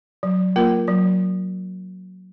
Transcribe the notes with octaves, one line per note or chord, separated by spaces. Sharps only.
F#3
A#3 F4 A#4
F#3